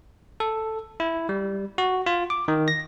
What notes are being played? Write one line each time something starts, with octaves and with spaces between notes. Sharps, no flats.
A4
E4
G3
F#4
F4
D6
D#3
A#6